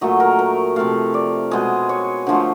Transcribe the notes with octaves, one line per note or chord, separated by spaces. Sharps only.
A#2 F#3 A3 D#5
A#4
A#4
C3 F3 A3 F5
D5
B2 G#3 D#5
C#5
D3 F3 A3 C5